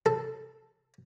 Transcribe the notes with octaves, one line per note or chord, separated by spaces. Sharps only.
A4